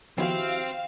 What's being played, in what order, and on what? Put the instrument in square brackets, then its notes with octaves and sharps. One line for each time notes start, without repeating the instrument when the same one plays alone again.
[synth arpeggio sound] D#3 F3 B3 [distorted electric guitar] C4 [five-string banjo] E4 F#4 G4 [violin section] F5